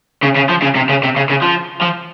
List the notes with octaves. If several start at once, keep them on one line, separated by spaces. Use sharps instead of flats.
C#3
C#3
F3
C#3
C3
C#3
C3
C#3
C#3
F3
F3